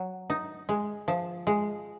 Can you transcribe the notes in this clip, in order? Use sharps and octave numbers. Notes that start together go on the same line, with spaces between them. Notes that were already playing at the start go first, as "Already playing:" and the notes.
Already playing: F#3
D#4
G#3
F3
G#3